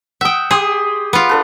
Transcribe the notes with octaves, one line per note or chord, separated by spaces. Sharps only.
E5 F#5 G5 D#6
G4 G#4 C6 D#6
B3 F4
D4 A4 B4